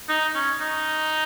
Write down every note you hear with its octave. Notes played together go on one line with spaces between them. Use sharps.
D#4
C#4
D#4